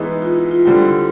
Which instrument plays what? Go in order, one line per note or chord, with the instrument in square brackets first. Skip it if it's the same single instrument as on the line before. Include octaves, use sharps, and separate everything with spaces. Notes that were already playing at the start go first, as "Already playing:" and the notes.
Already playing: [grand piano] E3 G#3 B3 D#4
[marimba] F4
E4
F4
[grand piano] D3 G3 C4 [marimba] F4
[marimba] E4